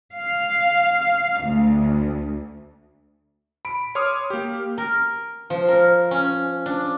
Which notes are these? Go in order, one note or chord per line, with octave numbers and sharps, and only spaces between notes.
F5
D2
B5 D7
C#5 C6 D6 D#6 F6
A#3 G4
A#4
F3
A#4
C#4
D4